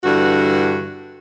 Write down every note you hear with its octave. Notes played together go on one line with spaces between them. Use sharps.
G2 D3 E3 F#4